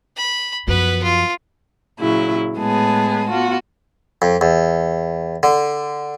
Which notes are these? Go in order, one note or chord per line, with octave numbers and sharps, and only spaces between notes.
B5
F#2 F3 B3 B4
F4
A#2 C#3 F#3 E4
A2 G#3 B3 G#4 A5
B3 F4 F#4
F2
E2
D3